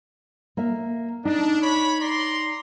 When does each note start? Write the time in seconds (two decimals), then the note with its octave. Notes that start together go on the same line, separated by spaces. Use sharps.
0.57 A#3 E5
1.25 D4 D#4
1.62 C#5 B5
2.01 D5 A#5 C6